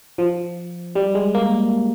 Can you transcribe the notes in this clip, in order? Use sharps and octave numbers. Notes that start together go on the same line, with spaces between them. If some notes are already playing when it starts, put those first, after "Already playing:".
F3
G3
G#3
A#3